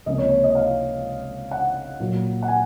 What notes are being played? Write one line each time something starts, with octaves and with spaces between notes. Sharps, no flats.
C#2 C3 F3 A#3 C#4 D#5
C#5
C#5
D#5
F5
F#5
A#2 F#3 A#3
F#5
G#5